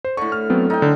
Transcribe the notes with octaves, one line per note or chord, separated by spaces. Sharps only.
C5
A2 D3 C#6
F6
F#3 B3 C4
D#4 A4 G5
D3